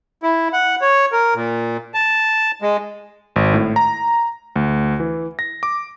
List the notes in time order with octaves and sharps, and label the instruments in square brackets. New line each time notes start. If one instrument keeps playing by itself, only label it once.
[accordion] E4
F#5
C#5
A#4
A#2
A5
G#3
[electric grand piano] G#1
A2
A#5
D2
E3
A#6
D6